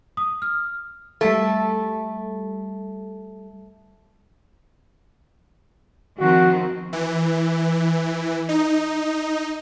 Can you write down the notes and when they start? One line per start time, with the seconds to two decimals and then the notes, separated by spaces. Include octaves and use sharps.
0.17 D#6
0.42 F6
1.21 G3 A3 A4
6.19 D#3 F3 C4 F#4
6.93 E3
8.49 D#4